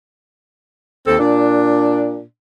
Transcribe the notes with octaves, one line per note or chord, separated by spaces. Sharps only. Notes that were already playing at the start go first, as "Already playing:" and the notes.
D#2 C4 A4
A#2 D4